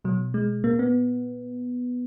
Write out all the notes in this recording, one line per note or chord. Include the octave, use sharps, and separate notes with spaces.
B2 F#3
G#3
A#2 A#3
B3